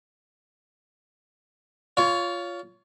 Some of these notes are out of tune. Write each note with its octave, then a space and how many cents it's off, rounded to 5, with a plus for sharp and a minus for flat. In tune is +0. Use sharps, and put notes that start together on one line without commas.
F4 +0 C#5 +25